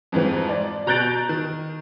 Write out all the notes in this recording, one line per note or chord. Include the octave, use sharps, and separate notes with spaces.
F2 G#2 E3 F3
D5
B2 A#5 F#6 G6 A6 D7
D#3